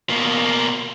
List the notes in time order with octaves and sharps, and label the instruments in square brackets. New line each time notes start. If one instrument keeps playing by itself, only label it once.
[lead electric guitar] B2 A#3